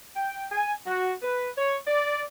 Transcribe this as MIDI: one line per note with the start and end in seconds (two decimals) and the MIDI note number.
0.16 0.45 79
0.52 0.74 80
0.87 1.12 66
1.22 1.50 71
1.58 1.77 73
1.87 2.22 74